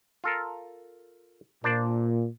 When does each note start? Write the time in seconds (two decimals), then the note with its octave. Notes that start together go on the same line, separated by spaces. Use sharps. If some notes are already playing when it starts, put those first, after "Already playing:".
0.24 F4 A4 A#4
1.64 A#2 D4 C5 D5